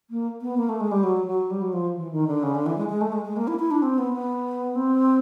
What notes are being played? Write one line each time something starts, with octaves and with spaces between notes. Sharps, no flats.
A#3
B3
A#3
A3
G#3
G3
F#3
F#3
G3
F#3
F3
E3
D#3
D3
C#3
D3
E3
G#3
G#3
A3
G#3
G#3
A#3
E4
E4
D4
C4
B3
B3
C4